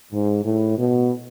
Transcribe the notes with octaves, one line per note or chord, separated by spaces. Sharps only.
G#2
A2
B2